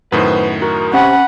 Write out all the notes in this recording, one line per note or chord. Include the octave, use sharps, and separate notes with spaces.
F#2 A2 D#3 B3 B4 C5
F#4 A#4
C3 C#4 F#5 G#5 B5